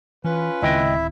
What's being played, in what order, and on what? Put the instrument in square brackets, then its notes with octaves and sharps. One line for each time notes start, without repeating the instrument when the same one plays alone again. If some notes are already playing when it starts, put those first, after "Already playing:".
[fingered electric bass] E3 [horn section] C#4 F4 B4
[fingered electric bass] D1 D#3 C4 [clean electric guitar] C#2 D#5 G5 [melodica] E4 E5